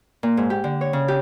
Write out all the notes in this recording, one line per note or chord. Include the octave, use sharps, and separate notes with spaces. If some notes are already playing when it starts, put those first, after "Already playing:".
A#2
G#2
G4
D3
C#5
C#3
G4